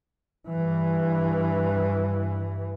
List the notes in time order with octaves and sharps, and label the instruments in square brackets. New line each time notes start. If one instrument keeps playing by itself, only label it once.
[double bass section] G2 E3